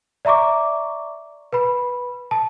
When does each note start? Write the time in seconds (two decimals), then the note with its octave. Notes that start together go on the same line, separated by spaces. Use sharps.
0.25 D5 E5 A#5 C#6 D6
1.53 B4 B5
2.31 A5